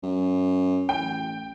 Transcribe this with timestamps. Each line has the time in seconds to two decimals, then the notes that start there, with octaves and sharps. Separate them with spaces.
0.03 F#2
0.89 A1 G5